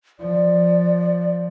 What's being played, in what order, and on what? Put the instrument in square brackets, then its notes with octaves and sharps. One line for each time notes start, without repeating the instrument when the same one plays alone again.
[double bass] F3 [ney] D5